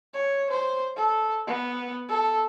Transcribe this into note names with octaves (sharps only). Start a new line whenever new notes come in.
C#5
C5
A4
B3
A4